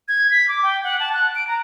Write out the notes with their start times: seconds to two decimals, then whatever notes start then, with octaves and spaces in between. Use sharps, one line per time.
0.08 G#6
0.31 B6
0.48 D6
0.63 G5
0.83 F#5
1.00 A5
1.14 F#6
1.35 D7
1.47 A#5